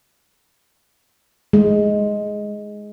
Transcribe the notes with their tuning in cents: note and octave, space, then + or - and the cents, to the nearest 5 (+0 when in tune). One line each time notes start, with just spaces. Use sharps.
G#3 +5